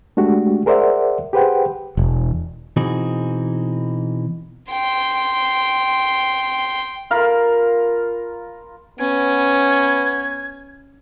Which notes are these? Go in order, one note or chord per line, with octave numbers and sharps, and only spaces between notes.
G#3 A3 D4 F#4 G4
G#4 A#4 C5 D5 E5 F#5
G4 G#4 B4 C5 F#5 G5
E1
B2 E3 C4 D#4 F#4 G#4
G5 C6
F4 A#4 F5 B5
B3 C#4 G#6